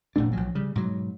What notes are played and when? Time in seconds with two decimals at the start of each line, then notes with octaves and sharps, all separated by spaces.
0.16 F1 A#2 A3 D4
0.33 B1 F3 F#3
0.55 C#3 G3
0.75 G#2 B2 F#3